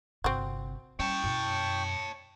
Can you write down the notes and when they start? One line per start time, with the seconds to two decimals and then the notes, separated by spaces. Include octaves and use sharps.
0.24 G1 C3 C4 F#4
0.99 G3 C#4 C#5 G5 A5 C#6
1.24 F#2 B2